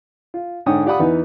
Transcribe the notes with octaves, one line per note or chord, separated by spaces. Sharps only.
F4
G#2 D3 C#5 G5 D#6
F4 G4 D5 F#5 B5 D#6
E2 E3 B3 D#4